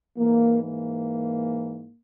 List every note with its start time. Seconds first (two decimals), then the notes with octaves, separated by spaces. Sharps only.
0.18 G#2 E3 A#3
0.62 A#3